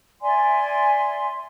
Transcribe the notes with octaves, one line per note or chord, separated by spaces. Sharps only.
D5 E5 G#5 C6